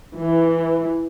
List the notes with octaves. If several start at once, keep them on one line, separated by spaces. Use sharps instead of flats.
E3